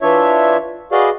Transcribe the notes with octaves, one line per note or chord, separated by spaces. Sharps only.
E3 D4 F4 C#5 E5
F#4 G#4 B4 D5 D#5 F5